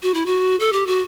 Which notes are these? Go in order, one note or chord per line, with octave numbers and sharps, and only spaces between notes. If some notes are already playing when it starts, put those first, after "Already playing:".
F#4
E4
F#4
A4
G4
F#4